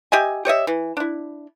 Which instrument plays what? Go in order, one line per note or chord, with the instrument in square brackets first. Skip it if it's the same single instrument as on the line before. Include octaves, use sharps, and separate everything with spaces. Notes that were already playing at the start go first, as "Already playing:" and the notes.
[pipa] G4 D#5 E5 G#5
G4 C#5 D#5 E5
E3
D4 E4